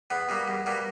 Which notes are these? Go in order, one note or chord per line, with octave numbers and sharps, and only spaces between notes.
E2 B3
B2 G3 A#3
E2
B2 G3 A#3